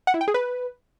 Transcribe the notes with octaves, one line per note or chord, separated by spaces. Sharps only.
F#5
E4
G5
G#4
B4